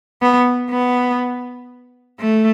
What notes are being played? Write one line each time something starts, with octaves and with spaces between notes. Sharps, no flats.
B3
B3
A3